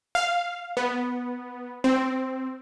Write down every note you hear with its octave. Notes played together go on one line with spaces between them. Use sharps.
F5
B3
C4